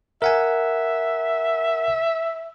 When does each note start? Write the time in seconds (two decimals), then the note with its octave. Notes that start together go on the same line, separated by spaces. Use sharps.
0.22 A#4 E5 F#5 G#5